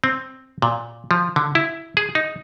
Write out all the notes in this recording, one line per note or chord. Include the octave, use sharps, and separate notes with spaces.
C4
A#2
F3
D3
E4
G#4
D#4